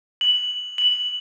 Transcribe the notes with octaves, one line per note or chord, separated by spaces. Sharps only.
F#7
F#7